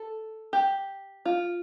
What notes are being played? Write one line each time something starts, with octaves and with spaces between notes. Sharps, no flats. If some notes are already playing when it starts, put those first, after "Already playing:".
Already playing: A4
G4
F4